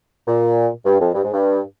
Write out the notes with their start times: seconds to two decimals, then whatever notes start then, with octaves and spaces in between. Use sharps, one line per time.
0.28 A#2
0.86 G2
1.00 F2
1.14 G2
1.24 G#2
1.33 G2